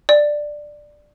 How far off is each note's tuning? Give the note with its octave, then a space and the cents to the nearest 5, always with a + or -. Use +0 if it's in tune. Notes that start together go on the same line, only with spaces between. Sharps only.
D5 +10